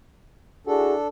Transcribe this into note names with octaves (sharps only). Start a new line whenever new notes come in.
D4 E4 F#4 G#4 A4